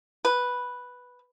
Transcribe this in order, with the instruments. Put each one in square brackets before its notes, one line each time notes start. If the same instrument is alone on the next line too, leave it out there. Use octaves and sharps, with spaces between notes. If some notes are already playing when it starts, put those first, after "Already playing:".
[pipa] B4